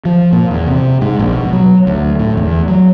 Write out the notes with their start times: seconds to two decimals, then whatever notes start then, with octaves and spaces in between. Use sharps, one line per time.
0.05 F3
0.33 A#2
0.51 E2
0.67 C3
1.01 G#2
1.19 A#1
1.32 B2
1.53 F#3
1.87 D2
2.19 A2
2.37 E2
2.68 F#3